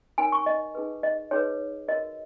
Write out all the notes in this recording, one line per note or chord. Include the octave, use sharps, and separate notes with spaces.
D#4 A#4 C#5 G#5
C#6
D#5
D#4 G#4 B4
D#5
D#4 G#4 B4 C#5
F#4 A#4 C#5 D#5